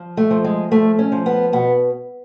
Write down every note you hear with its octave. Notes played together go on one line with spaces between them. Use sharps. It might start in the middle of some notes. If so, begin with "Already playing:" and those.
Already playing: F3
A3
F3
G#3
F3 A3
C#4
F3
B3
B2 B3